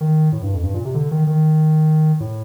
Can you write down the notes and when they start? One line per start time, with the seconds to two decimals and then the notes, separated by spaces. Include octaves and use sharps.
0.01 D#3
0.32 A2
0.42 G2
0.54 F2
0.63 G2
0.74 A#2
0.85 C3
0.95 D3
1.11 D#3
1.27 D#3
2.20 A2